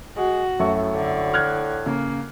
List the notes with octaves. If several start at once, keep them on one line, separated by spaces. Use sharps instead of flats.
G#3 F#4
F#2 A2 A3 C#6
D3
F6 F#6 G#6
C#3 A#3